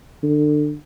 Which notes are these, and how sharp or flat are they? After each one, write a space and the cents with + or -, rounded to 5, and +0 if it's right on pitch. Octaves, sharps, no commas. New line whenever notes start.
D3 +25